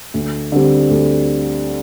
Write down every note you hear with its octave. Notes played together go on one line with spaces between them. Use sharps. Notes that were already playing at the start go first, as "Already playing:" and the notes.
D2
D3 G3 C4 G4
D2